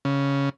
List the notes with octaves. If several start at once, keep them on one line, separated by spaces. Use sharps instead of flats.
C#3